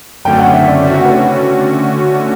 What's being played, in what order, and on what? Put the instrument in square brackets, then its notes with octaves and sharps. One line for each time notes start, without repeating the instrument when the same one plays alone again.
[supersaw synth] F#2 D3 A3 C#4 [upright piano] G5
[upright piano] F#5
E5
D5
[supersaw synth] D3 A3 C#4 F#4 [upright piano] E5
[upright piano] F#5
B4
C#5